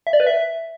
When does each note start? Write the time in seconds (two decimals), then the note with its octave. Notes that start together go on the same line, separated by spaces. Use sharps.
0.07 E5
0.13 D5
0.20 B4
0.27 E5